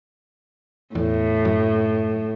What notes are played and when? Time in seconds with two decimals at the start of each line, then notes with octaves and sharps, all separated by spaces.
0.95 E2 A2
1.45 F#2